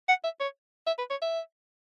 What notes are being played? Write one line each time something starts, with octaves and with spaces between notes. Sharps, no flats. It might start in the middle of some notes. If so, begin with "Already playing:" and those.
F#5
E5
C#5
E5
B4
C#5
E5